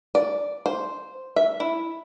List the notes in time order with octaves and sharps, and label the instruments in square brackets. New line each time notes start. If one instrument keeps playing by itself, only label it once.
[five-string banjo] D5
C5
E5
E4